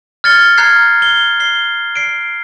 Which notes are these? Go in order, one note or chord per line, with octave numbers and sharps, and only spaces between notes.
F6 G#6 A6 C#7 G7
A#5 F6 F#6 G#6 C7
G7
C7 G7
C7 D7